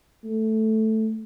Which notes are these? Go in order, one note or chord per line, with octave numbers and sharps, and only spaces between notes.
A3